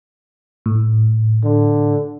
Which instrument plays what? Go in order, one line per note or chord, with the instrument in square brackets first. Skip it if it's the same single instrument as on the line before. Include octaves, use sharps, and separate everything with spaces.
[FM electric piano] A2
[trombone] D3